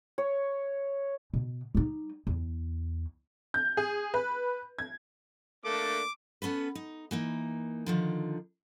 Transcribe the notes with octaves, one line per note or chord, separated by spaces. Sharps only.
C#5
B2
G3 D#4
E2
G6
G#4
B4
G#6
A3 A#3 D4 D6
B3 C#4 A4 B4
D#4
E3 A#3 D#4
D3 D#3 F3